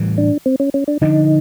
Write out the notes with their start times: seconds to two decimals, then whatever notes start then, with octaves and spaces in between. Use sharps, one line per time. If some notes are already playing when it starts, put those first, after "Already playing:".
Already playing: A2 E3 G3
0.18 D4
0.46 C4
0.60 C#4
0.74 C#4
0.88 D4
1.01 D3 F3 A3 D4 D#4